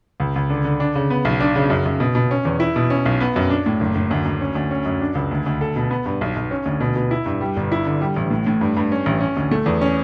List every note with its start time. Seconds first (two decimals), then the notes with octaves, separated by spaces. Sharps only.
0.20 C#2
0.36 C#2
0.50 D3
0.65 D3
0.80 D4
0.95 C#3
1.10 B3
1.25 B1
1.40 D4
1.56 C#3
1.70 F#2
1.86 F#2
2.00 B2
2.15 B2
2.31 C#4
2.45 E2
2.60 E4
2.76 B2
2.90 C#4
3.06 B1
3.21 B3
3.36 F#2
3.50 D4
3.66 A2
3.81 F#1
3.95 F#1
4.11 D2
4.25 D2
4.41 C#4
4.55 D2
4.71 C#4
4.86 F#2
5.01 D4
5.15 C#2
5.31 D2
5.46 D2
5.61 A4
5.76 B2
5.91 B3
6.06 G2
6.21 B1
6.36 B1
6.51 C#4
6.66 D2
6.80 B2
6.96 B2
7.11 E4
7.26 G2
7.41 G3
7.57 G1
7.72 E4
7.86 D3
8.01 G3
8.16 A1
8.30 A2
8.46 A2
8.61 G2
8.77 G2
8.92 C#4
9.06 A1
9.21 C#4
9.37 D2
9.51 A3
9.66 E2
9.81 C#4